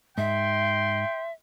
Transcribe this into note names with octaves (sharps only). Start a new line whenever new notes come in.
G#2 E5 G5 C6